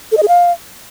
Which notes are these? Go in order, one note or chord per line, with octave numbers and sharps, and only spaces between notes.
A4
D#5
G#4
F5